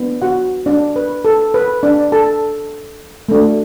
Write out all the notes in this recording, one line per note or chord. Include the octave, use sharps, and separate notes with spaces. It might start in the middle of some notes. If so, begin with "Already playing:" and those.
Already playing: B3 D4
F#4 F#5
D4 D5
B4
A4
B4
D4 D5
A4 A5
A3 D4 F#4